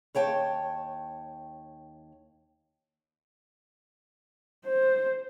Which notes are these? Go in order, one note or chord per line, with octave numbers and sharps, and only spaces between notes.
D#2 C#5 G5 A5
C5